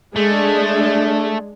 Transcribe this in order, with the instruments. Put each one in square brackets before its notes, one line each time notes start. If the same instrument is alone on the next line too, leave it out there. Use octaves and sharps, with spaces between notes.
[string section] G#3 D4 [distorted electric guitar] A3